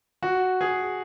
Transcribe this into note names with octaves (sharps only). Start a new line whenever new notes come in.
F#4
G#4